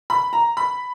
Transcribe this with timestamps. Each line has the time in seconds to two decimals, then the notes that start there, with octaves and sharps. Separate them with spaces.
0.10 B5
0.33 A#5
0.57 B5